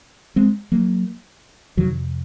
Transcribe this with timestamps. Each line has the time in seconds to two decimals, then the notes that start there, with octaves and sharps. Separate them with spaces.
0.36 G#3 C4
0.72 F#3 A#3
1.77 F2 C3 D#3 F#3